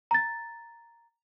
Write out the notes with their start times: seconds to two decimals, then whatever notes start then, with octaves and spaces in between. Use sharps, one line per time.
0.11 A#5 A6